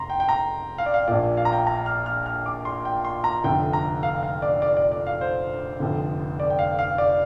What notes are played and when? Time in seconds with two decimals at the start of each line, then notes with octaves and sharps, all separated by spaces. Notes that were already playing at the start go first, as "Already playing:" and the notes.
Already playing: F1 A#5 C6
0.10 G5
0.20 G5
0.29 A#5
0.78 F5
0.86 D5
0.94 F5
1.08 A#1 A#2 D5
1.37 F5
1.45 A#5
1.52 G5
1.67 A#5
1.86 F6
2.06 F6
2.26 F6
2.46 D6
2.65 C6
2.85 G5
3.05 C6
3.24 A#5
3.44 F1 F2 D3 G5
3.73 A#5
4.03 F5
4.23 F5
4.42 D5
4.62 D5
4.77 D5
4.92 D5
5.07 F5
5.21 C5
5.80 F1 F2 D3
6.40 D5
6.50 G5
6.59 F5
6.79 F5
6.98 D5